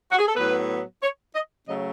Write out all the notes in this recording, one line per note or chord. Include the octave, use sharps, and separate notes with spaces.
F#4
G#4
A4
A2 F#3 B3 B4
C#5
D#5
C#3 F#3 A3 D#5